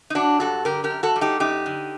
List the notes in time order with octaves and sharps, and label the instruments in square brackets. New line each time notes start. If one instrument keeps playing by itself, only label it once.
[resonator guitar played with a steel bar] D#4
F#3 D4 F#4
G2 F#4 A4
D3 G4 A#4
G4 A#4
F#2
F#4 A4
G3
D#4 G4
F#2 D#4 G4
D3